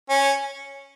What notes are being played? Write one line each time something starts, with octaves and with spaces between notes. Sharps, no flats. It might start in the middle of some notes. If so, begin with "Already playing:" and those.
C#4